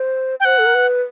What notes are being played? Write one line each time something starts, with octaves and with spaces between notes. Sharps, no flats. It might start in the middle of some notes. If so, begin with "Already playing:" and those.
Already playing: C5
G5
C5 F#5
A4
A#4
B4